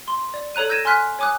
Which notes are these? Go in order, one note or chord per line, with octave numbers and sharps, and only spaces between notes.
C6
D5
A4 C#5 A#5 F#6 D#7
E6 G6 G#6 A#6 D#7 E7
G#5 C6 F6 F#6 B6
C#5 G#5 D6 D#6 F#6